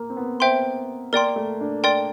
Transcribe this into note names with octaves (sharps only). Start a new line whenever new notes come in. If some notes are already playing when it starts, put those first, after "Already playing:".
Already playing: A#3
C4
B3
C5 E5 G5 C6
A#3 A#4 D5 G5 C6
A3
D4
A#4 D5 G5 C6